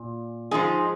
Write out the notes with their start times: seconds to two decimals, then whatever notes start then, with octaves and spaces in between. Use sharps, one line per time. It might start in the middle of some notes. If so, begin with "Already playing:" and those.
Already playing: A#2
0.51 G#2 F3 G#3 D#4 G#4